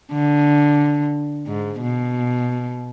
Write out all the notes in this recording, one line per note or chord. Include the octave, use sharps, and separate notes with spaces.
D3
G#2
B2